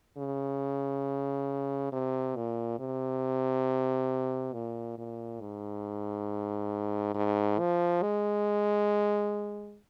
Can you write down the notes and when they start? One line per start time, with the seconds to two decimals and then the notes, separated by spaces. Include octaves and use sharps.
0.18 C#3
1.92 C3
2.36 A#2
2.79 C3
4.53 A#2
4.98 A#2
5.41 G#2
7.15 G#2
7.59 F3
8.02 G#3